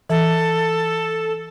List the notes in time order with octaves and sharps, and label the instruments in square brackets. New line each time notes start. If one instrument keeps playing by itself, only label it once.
[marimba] E3 [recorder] A4